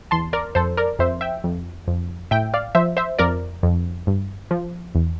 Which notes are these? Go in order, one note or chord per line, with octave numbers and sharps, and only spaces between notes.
E2 A5 C6
A#4 D5
F2 A4 C5
A#4 D5
F2 C5 E5
E5 G5
F2
F2
A2 E5 G5
D5 F5
F3 C5 E5
C5 E5
F2 A#4 D5
F2
G2
F3
E2